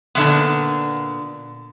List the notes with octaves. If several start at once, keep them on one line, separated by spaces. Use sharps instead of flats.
A#2 D3 E3 B3